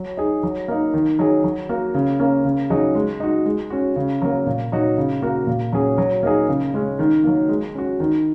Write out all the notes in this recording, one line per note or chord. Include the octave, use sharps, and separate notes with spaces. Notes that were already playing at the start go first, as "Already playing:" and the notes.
Already playing: F#3
D#4 G#4
F#3
A#3 D#4
D#3
F#3 D#4 G#4
F#3
A#3 F#4
C#3
A#3 C#4
C#3
F#3 D#4 G#4
G#3
D#4 F#4
G#3
C#4 F#4
C#3
F#3 A#3
A#2
F#3 D#4 F#4
C#3
A#3 F#4
A#2
F#3 C#4 G#4
F#3
A#3 D#4 G#4
C#3
G#3 C#4
D#3
F#3 A#3
G#3
C#4 F#4
D#3